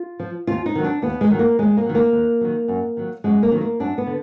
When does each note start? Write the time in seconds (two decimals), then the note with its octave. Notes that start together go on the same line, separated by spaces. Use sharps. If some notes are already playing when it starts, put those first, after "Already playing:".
Already playing: F4
0.20 F3
0.47 D#2 F4
0.66 D#4
0.75 D#3 F#3
0.84 D4
1.02 D#2 B3
1.21 G#3
1.30 D#3 F#3
1.39 A#3
1.59 D#2 G#3
1.77 A#3
1.86 D#3 F#3
1.95 A#3
2.13 D#2
2.41 D#3 F#3
2.68 F#2
2.97 D#3 F#3
3.24 F#2 G#3
3.43 A#3
3.52 D#3 F#3
3.61 A#3
3.80 F#2 D4
3.98 B3
4.07 D3